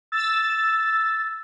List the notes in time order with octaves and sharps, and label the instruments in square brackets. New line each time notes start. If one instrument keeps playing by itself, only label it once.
[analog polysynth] E6 A6